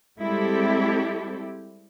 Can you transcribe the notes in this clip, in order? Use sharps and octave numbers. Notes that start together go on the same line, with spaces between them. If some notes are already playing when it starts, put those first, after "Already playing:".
G3 G#3 C4 E4 G4 A4